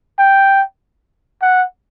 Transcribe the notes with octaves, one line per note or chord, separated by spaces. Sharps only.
G5
F#5